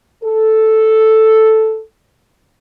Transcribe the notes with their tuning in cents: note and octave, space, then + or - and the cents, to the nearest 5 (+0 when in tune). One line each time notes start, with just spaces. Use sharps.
A4 +0